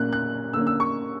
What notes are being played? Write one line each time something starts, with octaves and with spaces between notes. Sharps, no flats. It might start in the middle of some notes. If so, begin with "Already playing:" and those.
Already playing: A#2 A#3 C#4 F#6
F#6
D3 A#3 C#4 E6
E6
C#6